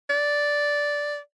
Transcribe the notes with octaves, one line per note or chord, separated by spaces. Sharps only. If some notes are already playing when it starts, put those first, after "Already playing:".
D5